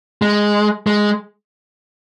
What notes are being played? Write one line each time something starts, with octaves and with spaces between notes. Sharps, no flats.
G#3
G#3